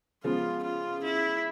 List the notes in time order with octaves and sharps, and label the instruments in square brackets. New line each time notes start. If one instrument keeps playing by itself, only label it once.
[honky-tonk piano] C#3 F3 G#3 B3 [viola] F4
[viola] F4
E4